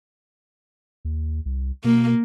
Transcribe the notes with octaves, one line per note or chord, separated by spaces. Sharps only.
D#2
C2
B2 A#3